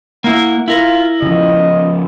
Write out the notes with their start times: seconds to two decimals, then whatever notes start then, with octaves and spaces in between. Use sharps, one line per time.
0.24 A#3 E4 F#5
0.68 E4 F4 A#4
1.22 C#3 F3 D#5